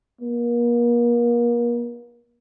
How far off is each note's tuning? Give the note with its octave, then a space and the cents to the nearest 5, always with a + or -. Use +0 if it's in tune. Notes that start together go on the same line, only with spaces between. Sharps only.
A#3 +35